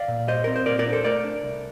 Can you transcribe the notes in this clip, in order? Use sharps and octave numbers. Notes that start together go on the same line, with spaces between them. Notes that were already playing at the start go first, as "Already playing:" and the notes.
Already playing: D5 F5
A#2
G3 C5 D#5
C4 A#4
C5
A#2 A#4 D5
A#4 D5
D4
A4 C5
A3 A#4 D5
D4
C2